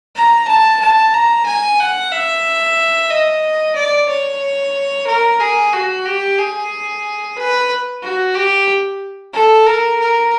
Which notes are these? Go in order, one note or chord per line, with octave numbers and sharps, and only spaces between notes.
A#5
A5
A5
A#5
G#5
F#5
E5
D#5
D5
C#5
A#4
G#4
F#4
G4
G#4
B4
F#4
G4
A4
A#4
A#4